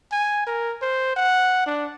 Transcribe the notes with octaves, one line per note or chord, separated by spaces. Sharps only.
G#5
A#4
C5
F#5
D4